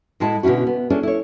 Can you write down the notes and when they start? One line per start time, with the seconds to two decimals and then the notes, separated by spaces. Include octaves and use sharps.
0.20 A2 G#3 E4 A5
0.43 B2 D3 C#4 E4 F#4
0.67 B3
0.90 C#4 D4 E4 G#4 A4
1.03 E4 C#5